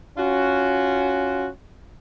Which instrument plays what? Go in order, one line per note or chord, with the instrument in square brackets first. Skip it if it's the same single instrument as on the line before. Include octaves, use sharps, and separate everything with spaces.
[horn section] C#4 F4 F#4